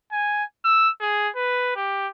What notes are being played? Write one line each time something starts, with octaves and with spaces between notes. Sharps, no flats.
G#5
E6
G#4
B4
G4